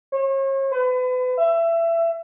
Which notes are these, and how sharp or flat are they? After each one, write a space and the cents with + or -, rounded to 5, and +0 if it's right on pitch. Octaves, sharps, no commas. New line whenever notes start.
C#5 -40
B4 +35
E5 +25